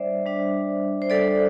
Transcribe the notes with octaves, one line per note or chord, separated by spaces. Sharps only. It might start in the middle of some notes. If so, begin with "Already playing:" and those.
Already playing: G3 D4 C5 D5 E5
G3 D4
C5
G3 D4 A4 D5